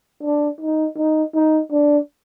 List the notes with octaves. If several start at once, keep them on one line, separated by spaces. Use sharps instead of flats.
D4
D#4
D#4
D#4
D4